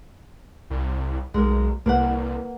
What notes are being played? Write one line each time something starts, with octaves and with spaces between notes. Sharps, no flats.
C2
B1 G#3 A#4
C2 A#3 B4 F#5